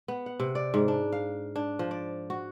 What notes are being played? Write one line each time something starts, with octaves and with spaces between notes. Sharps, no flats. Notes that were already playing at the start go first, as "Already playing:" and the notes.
B3
F#5
C3
D5
G#2
D4
F5
D4
F3
D5
F#4